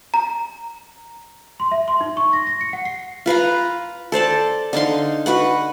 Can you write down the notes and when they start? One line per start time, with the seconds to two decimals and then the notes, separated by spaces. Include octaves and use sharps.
0.14 A#5
1.60 C6
1.71 E5
1.88 C6
2.01 D#4
2.17 C#6
2.33 A#6
2.47 A#6
2.61 C#7
2.73 F#5
2.85 C7
3.26 F4 B4 F5 A#5
4.12 A4 C5 D5 A5
4.73 D3 D#4 F5 C6
5.26 F#4 B4 F#5